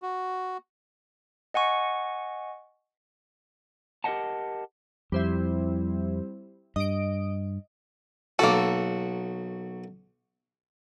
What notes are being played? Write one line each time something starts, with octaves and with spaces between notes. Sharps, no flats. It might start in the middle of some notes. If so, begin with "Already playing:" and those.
F#4
D#5 F#5 G#5 C#6
G4 A#4 C5 D#5 F#5 A5
F2 G3 C4 E4
G2 D#5 D7
B1 A#3 F#4 A4